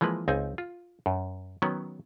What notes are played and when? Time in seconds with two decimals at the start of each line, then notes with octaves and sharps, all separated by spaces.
0.01 E3 F3 G#3 A#3 B4
0.28 C#2 C4 D#4 G#5
0.58 F4
1.06 F#2
1.62 D#3 F#3 B3 C#4